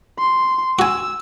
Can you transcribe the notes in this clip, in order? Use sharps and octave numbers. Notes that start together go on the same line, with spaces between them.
C6
F#4 G#5 E6